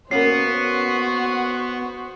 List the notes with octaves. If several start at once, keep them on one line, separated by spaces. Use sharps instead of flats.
A#3 B3 C#4 F#4 C5 C7